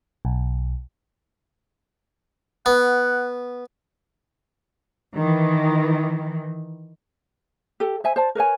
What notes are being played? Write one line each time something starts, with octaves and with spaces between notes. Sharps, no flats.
B1
B3 F#5
D#3 E3
G4 A4
C5 E5 G#5
C5 D5 A5
A#4 B4 C#5 G#5